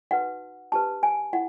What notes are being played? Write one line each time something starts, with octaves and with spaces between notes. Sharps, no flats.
D#4 F#4 B4 F#5
D4 G4 B4 A5
G#5
E4 F#5